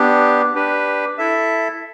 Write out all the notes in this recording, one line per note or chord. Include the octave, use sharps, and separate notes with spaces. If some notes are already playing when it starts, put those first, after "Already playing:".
Already playing: B3 D4 G4
D4 G4 B4
E4 A4 E5